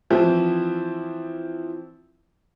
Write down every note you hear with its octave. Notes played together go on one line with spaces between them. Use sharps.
E3 F3 C4 E4